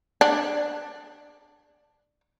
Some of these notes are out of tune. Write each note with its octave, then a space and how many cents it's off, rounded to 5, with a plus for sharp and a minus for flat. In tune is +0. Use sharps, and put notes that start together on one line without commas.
D4 +15